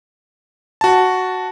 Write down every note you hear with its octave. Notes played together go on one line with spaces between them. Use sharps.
F#4 A5